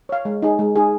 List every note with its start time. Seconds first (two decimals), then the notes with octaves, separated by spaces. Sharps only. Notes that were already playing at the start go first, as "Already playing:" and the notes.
0.09 C#5 F5
0.25 G#3
0.42 D#4 G#4
0.59 G#3
0.76 D#4 G#4